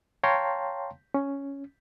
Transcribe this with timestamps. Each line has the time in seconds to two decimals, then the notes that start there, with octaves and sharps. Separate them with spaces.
0.23 C#5 F5 G5 A5 A#5 C6
1.14 C#4